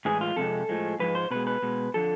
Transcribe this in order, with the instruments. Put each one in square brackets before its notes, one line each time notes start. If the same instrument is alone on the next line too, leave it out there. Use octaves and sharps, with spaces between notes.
[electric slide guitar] A2 E3 G#3 G#4
F4
F2 C3 G#3 A4
A2 F3 G#3
G#2 F3 G#3 B4
C5
B2 G#3 B4
B4
B2 G#3
D3 F3 A4